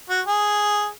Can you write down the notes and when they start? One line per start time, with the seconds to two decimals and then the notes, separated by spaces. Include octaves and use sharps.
0.09 F#4
0.27 G#4